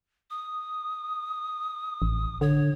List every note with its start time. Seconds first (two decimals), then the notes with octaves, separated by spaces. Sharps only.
0.30 D#6
2.02 A1
2.41 D3 C#5